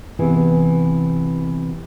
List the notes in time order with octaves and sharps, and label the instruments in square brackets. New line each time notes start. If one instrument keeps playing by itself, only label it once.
[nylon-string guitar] C3 E3 B3 G#4